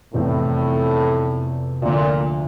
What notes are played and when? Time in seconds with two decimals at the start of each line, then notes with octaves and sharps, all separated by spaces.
0.14 F1 E2 A2 E3 A3 C4
1.82 D2 A#2 D3 F3 A#3